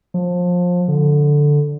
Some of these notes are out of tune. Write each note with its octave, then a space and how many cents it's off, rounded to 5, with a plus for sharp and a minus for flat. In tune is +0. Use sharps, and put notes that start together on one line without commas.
F3 +25
D3 +0